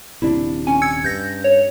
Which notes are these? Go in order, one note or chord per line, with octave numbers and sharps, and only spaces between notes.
D#1 C3 D4 E4
C#4 G#5
E6 G#6 C#7
G2 G6 A#6
C#5